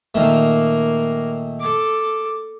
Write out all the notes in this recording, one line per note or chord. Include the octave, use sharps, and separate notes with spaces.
A#2 D#3 A3 A#3
A4 D6